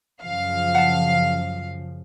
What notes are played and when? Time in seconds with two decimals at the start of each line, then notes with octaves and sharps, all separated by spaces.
0.22 F#2 C#3 F3 F5
0.75 F#5 A5